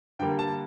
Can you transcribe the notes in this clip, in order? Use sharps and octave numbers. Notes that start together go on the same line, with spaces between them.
G2 D3 G3 A#3 G5
A5